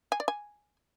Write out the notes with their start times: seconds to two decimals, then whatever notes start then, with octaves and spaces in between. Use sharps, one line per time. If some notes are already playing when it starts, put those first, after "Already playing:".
0.12 G#5
0.20 D5
0.28 G#5